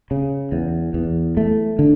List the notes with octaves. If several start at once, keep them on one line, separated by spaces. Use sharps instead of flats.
C#3
E2
E2
A3
D3